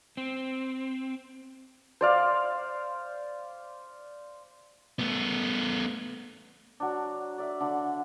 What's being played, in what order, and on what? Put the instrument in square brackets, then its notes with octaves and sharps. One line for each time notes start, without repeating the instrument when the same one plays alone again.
[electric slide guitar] C4
[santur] C5 D5 F5
[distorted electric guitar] A3 B3
[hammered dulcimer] F#3 D4
D5 E5
D3 D4